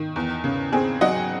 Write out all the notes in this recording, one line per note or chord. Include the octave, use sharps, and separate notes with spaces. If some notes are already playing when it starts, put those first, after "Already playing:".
Already playing: D#3
E2
C#3
C4 G#4
F#3 D#5 F#5